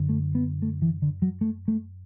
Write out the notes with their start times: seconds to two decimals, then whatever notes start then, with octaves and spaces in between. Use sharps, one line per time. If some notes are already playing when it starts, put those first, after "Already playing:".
Already playing: F#2 D3
0.09 A3
0.35 B3
0.62 A3
0.82 E3
1.02 D3
1.22 F#3
1.41 A3
1.68 A3